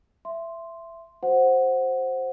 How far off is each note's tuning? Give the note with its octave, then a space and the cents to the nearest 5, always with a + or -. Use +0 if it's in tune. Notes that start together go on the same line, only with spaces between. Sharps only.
E5 +15 C6 +0
F#4 +0 C5 +5 F#5 -5